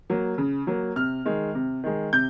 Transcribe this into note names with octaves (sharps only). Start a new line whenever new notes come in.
F#3 A#3
C#3
F#3 A#3
C3 F6
D#3 G#3
C3
D#3 G#3
C3 G6